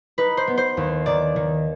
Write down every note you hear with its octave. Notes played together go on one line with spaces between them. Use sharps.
D#4 B4
C5
B3
C5
D#2
D#3 D5
D#3